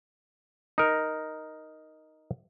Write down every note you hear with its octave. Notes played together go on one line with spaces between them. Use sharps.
D#4 A#4